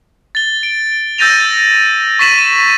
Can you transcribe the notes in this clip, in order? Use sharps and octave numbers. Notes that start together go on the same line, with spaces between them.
A6 G7
D7
E6 G6 A6 A#6 D#7 F7
C#6 A6 B6 D#7 E7 F#7